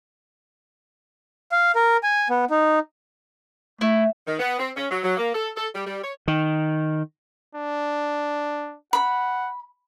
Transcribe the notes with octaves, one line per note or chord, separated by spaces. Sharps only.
F5
A#4
G#5
B3
D#4
A3 E4
D#3
B3
C4
C#4
F#3
F#3
A#3
A4
A4
G3
G3
C#5
D#3
D4
F#5 B5